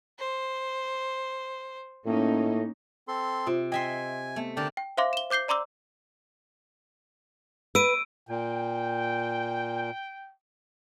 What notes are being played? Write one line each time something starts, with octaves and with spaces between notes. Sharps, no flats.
C5
A2 A#3 C#4 D#4
C4 A4 C6
C3 F4
D#5 E5 G5 G#5 C6
A3 B3
D3 A#4 D5 G5 A5
G5
C5 E5 F5 C6 D6
E7 G7
C5 D6 G6 C7 G7
D5 A#5 C6 D6 E6
B4 E6 D7 D#7
A#2 G5